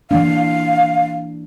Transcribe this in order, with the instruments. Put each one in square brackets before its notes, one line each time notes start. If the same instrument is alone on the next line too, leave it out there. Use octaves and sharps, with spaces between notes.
[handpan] E3 A#3 D4 [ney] F5